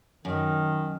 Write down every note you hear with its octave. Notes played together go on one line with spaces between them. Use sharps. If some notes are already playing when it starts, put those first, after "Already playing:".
F#2 D#3